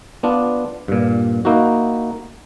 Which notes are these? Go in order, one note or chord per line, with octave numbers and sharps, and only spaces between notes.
B3 D4 F4
G2 A#2
A#3 D#4 E4 F#4